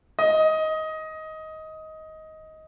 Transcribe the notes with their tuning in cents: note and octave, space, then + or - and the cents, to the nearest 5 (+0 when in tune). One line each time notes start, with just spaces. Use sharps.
D#5 +15